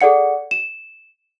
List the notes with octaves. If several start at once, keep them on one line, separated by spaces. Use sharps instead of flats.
G#4 A4 D5 F#5 C#7
E7